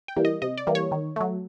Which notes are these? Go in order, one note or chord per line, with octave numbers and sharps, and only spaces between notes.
G5
E3 G3 A#3
D#5
C3 D#5
D5
E3 G3 A#3
C#5
D#3
F#3 A3